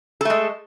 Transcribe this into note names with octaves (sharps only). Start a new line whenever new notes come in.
G#3 A3 A4